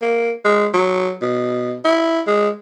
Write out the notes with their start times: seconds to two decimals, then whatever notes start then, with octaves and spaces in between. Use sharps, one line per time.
0.02 A#3
0.45 G#3
0.74 F#3
1.22 B2
1.85 E4
2.27 G#3